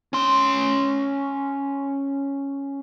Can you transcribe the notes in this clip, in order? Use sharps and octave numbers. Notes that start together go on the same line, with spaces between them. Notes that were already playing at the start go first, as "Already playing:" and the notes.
C#4 C6